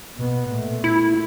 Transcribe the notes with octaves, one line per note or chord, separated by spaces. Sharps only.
B2 B3
A#2 A3
E4